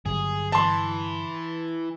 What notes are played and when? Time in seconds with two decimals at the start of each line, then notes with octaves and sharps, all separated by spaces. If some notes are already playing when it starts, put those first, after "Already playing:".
0.06 G2 D3 F#3 G#4
0.52 E3 A5 C6